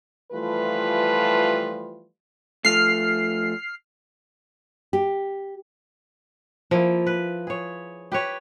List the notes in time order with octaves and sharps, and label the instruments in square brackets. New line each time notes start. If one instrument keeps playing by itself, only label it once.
[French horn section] E3 F3 G3 A3 F4 B4
[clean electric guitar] F3 A3 [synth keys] F6 C7
[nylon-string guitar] G4
[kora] F3 A#3 E4
B4
G#4 C#5
G4 B4 C#5